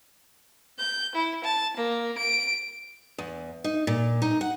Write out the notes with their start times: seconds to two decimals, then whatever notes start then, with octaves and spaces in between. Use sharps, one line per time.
0.78 G6
1.15 E4
1.44 A5
1.76 A#3
2.17 D7
3.18 E2
3.64 D#4
3.87 A#2
4.22 D#4
4.41 F#5